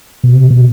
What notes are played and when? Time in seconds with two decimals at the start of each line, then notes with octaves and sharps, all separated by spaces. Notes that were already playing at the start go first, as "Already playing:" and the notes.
0.24 B2
0.34 C3
0.50 B2